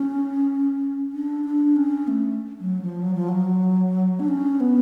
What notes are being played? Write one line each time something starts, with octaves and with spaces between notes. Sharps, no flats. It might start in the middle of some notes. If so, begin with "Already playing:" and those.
Already playing: C#4
D4
D4
C#4
A3
F#3
F3
F#3
F3
F#3
D4
C#4
B3